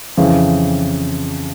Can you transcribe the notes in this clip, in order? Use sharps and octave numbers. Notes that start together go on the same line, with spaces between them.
F2 C#3 E3